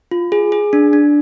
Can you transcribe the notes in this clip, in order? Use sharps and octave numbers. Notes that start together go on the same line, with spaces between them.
F4
G#4
G#4
D4
D4